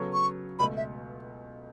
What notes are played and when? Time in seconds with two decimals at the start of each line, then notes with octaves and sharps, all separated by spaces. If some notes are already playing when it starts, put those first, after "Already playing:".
Already playing: C#3 F#3 B3 A4 C#5
0.13 C#6
0.59 C#2 B2 A3 B5
0.77 E5